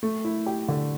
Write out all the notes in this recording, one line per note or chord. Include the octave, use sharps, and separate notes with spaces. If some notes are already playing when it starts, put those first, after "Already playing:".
A3
E4
G4
D3